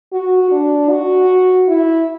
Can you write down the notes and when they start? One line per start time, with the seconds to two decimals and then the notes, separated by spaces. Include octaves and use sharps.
0.12 F#4
0.51 D4
0.90 F#4
1.68 E4